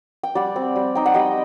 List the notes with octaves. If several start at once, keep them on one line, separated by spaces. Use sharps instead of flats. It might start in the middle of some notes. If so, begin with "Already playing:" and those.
G5
G3 D5 F#5
C4
G3
D#4 G5
F#5
G3 D#5 G5